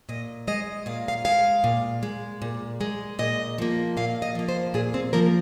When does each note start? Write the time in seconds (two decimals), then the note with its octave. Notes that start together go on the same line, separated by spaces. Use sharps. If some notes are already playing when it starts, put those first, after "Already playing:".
0.09 A#2 D#5
0.47 G#3 D#5
0.86 A#2 F5
1.08 F5
1.25 G#3 F5
1.64 A#2
2.03 G#3
2.42 A#2
2.81 G#3
3.19 A#2 D#5
3.58 F3 A#3
3.97 A#2 F5
4.22 D#5
4.35 F3 A#3
4.49 C5
4.74 A#2 G#4
4.94 C4
5.13 F3 A#3 A#4